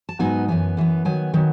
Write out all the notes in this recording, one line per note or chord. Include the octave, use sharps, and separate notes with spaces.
A5
G#2 F#3 B3 D#4 G#5
F#2 E3 B3 G#5
F#2 E3 B3
D#3 F#3 B3 G#5
D#3 F#3 B3